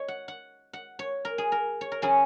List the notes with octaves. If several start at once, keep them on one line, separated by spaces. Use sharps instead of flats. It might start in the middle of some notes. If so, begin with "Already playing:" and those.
Already playing: C#5 D#5
F#5
F#5
F#5
C#5
A#4
G#4
A#4
C#5
A#4
C#3 F#3 C#4 G#4